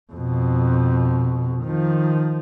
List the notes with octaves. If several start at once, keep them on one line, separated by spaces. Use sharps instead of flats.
F2 B2
D#3 F3